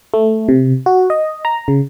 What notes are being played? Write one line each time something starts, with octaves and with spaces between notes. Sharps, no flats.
A3
C3
F#4
D#5
A#5
C#3